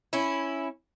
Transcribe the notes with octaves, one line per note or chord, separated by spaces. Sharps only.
C#4 E4